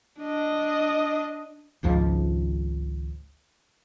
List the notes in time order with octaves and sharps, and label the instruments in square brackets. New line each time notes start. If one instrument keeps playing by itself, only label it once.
[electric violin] D4 D#5
[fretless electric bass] G#1 C#2 G#2 F3